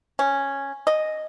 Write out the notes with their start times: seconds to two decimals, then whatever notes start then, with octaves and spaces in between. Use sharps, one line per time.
0.19 C#4
0.87 D#5